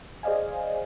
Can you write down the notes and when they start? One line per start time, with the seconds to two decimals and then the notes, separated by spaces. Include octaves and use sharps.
0.23 G#4 C5 D5 D#5 F5 G#5